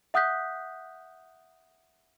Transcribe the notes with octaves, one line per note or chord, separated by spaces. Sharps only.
E5 F#5 D#6 F#6 G6 B6